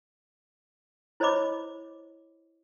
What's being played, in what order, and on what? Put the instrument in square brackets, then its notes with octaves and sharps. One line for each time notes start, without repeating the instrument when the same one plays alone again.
[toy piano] E4 C5 C#5 D#5 B5 D6